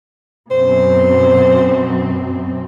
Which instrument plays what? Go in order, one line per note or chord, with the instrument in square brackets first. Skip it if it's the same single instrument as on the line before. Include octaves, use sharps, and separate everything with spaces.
[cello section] F#2 B2 C4 [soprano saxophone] C5